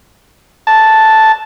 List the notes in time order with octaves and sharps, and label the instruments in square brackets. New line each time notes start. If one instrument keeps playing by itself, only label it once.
[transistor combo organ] A5